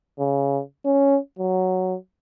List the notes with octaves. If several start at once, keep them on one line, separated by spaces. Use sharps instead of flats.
C#3
C#4
F#3